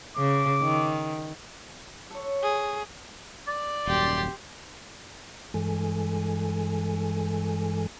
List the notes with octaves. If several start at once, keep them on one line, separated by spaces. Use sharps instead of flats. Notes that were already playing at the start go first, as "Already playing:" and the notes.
C#3 D6
D#3
A4 C#5
G#4
D5
D#1 F#2 G4 C6
G2 E3 G#3 A4 G#5